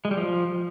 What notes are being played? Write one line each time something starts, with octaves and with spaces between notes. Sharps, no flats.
G#3
G3
F3